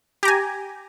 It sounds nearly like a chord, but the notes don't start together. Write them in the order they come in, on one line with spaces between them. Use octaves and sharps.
G4 A#5 G#5